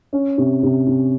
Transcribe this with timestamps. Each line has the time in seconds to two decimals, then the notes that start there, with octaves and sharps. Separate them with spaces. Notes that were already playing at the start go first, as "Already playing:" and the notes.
0.13 C#4
0.38 C3
0.63 C3
0.87 C3